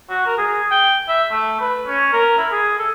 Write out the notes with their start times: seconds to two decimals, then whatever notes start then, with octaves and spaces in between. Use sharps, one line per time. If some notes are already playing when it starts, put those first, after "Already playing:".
0.10 F#4
0.26 A#4
0.38 G#4
0.71 G5
1.09 E5
1.31 A3
1.61 B4
1.88 C#4
2.13 A#4
2.38 E4
2.52 G#4
2.79 A4